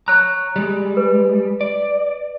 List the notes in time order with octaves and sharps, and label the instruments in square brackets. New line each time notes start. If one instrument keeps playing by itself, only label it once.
[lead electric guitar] C#5 A#5 [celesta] F#6
[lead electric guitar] G3 G#3
[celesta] B4
[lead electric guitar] D5